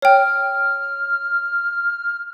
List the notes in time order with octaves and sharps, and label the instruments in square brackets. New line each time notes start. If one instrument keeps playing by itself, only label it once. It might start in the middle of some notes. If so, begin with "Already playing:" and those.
[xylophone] C#5 G5 [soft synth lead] F6